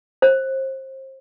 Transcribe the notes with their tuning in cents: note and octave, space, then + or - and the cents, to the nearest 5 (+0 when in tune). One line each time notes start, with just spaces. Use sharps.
C5 +25